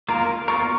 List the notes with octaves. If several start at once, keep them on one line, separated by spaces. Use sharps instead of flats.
A#3 F4 A#4 A#5
A#3 F4 A#4 C#6